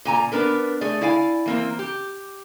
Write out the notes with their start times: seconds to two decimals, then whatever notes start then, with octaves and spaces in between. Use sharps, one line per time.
0.05 A#2 G#5 A#5
0.32 B3 D4 A#4 B4
0.81 A3 G#4 D5
1.01 E4 D5 F5 G#5
1.46 E3 A#3 C4
1.79 G4